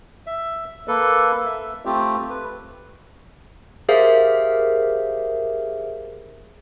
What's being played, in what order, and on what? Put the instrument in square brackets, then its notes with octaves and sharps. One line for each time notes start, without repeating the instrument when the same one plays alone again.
[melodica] E5
A#3 A4 B4
E5
A3 C4 F4 G4
B4
[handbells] G4 G#4 A#4 C5 E5 F5